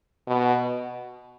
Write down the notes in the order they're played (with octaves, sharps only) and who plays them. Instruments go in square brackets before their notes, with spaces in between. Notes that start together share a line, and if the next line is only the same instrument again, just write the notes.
[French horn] B2